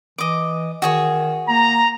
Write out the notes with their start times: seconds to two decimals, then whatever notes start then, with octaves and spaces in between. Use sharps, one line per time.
0.18 E3 D#5 D6
0.82 D#3 F#4 G#4 C#5
1.49 A#3 A#5